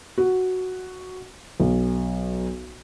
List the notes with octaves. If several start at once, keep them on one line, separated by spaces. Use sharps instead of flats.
F#4
B1